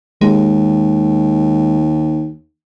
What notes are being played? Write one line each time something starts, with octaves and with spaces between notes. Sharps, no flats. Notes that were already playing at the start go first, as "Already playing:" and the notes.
D#2 G#3